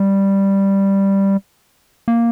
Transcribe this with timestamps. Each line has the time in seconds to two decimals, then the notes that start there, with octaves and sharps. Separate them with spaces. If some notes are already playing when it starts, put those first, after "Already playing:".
Already playing: G3
2.08 A#3